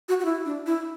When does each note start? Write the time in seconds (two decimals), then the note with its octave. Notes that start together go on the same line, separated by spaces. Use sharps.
0.09 F#4
0.20 F#4
0.25 E4
0.45 D4
0.66 E4